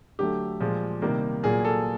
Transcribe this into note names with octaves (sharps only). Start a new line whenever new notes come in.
D3 F#3 A3 G4
A#2 F3 G#3
C3 D#3 G3 A#3
A#2 F#3 A#3 G#4
A4